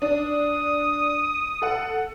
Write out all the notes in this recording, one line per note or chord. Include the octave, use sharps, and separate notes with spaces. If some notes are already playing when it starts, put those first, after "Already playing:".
D4 D#6
A4 F#5